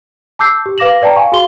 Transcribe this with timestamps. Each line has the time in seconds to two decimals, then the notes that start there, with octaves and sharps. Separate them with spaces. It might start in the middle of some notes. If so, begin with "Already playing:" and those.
0.39 A5 D6 E6 G6 C7
0.66 G4
0.78 B4 F5 D6 A#6 E7 F#7
1.02 B4 D5 G5 A5 A#5
1.16 F5 G#5 C#6
1.32 F#4 G#4 F5 C6 G7